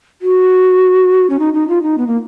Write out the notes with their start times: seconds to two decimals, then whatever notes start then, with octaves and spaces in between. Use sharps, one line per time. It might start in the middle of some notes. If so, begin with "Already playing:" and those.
0.22 F#4
1.30 C#4
1.39 D#4
1.54 D#4
1.68 F4
1.82 D#4
1.98 B3
2.07 A#3